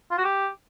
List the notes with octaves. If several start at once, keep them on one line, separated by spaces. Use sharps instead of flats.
F4
F#4
G4